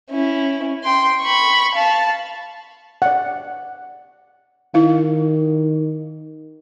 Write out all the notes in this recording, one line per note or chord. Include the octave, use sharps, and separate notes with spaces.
C#4 E4
G5 C6
B5 C#6
F5 A5
D5 F#5
D#3 E4 F5